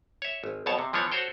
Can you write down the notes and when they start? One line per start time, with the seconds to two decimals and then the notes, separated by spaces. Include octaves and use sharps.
0.22 C#5 E5
0.44 G#1
0.66 B1 F2 B2 C#5 A5
0.79 C3
0.93 E3 F3 B3 D4 C#5
1.11 F#4 A4 C5 C#5 G5